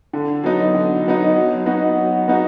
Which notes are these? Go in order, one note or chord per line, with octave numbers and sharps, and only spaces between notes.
D3
F#3 B3 D#4
D3
F#3 B3 D#4
F#3
B3 D#4 F#4
F#3
B3 D#4 F#4